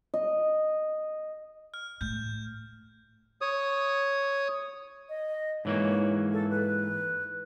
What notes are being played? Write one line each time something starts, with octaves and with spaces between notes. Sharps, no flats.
D#5
F6
A2 G6
C#5 D#6
D#5
G#2 E3 A#3 C#5
A4
B4